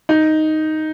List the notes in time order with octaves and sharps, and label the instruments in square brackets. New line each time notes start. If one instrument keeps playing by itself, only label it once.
[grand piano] D#4